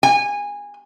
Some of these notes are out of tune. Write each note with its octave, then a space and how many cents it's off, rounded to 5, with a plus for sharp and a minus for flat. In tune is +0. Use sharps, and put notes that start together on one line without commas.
G#5 -20